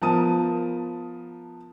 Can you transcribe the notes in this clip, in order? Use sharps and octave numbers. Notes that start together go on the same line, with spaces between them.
F3 B3 A#4 A5 D#6 D#7